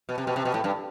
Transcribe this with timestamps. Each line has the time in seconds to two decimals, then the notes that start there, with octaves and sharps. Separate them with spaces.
0.09 B2
0.18 C3
0.27 B2
0.36 C3
0.45 B2
0.54 A2
0.64 G2